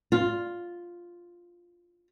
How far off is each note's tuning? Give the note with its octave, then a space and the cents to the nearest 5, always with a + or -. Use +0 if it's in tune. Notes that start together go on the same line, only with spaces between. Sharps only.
F4 +0